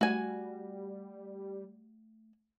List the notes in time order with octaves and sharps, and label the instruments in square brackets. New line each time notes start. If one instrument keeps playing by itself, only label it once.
[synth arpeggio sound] G3 [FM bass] A3 [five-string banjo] F#4 G#5